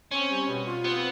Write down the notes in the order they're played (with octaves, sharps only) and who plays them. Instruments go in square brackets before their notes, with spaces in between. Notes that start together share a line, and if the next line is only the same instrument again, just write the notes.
[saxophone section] C4 [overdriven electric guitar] C#4
[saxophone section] G3
B2
F4
[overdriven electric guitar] B3 [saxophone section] C4